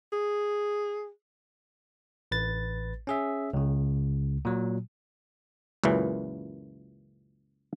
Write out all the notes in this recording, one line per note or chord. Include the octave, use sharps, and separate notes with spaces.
G#4
A1 B4 A6
C#4 G#4 E5
C#2 C#3
A#2 F#3
C#2 F#2 A#2 E3